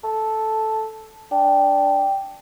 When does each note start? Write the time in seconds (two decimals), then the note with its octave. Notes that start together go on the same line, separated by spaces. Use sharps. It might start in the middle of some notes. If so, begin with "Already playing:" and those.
0.04 A4
1.31 D4 G5